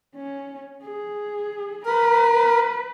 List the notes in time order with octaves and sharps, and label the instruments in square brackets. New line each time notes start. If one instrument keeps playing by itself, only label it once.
[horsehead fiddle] C#4
G#4
[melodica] A#4 [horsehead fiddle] B4